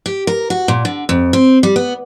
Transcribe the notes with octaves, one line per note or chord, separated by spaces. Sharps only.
G4
A#4
F#4
A#2
D3
F2
C4
G3
B3